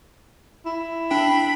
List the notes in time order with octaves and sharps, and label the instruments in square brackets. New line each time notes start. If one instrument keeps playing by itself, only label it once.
[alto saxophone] E4
[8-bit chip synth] D4 G5 [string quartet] B5